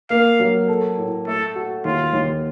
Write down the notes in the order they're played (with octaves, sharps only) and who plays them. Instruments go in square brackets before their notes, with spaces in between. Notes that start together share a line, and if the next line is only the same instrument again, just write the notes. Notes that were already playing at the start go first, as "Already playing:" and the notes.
[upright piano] A#3 [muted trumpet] F5
[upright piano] F#3
A4
A2
[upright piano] A3 [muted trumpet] A4
[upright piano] F#4
[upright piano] D#2 [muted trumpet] F4
[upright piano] D#2